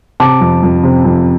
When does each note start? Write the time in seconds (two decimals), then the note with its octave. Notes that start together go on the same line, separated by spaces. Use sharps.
0.20 C3 A5 D6
0.41 F2
0.63 F2
0.83 C3
1.05 F2